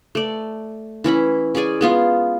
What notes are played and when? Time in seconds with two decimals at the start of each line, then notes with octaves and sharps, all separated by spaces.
0.15 A3 D5
1.04 E3 C#4 E4 B5
1.55 C#4 G#4 D5 G#5
1.81 G#3 B3 F4